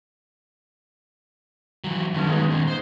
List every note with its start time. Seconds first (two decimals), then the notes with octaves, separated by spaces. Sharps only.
1.84 E3 F#3
2.14 B1 G2 D#3 C#4
2.28 G#3 B3 D#4
2.50 D#2 A#2
2.67 C5